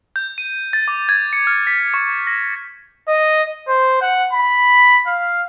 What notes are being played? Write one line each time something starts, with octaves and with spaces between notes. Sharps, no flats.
G6
D#7
A6
D6
G#6
C#7
F6
B6
C#6
A#6
D#5
C5
F#5
B5
F5